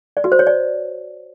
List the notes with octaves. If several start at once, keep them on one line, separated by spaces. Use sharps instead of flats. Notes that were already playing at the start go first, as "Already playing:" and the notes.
D5
F#4
C5
C#5
D5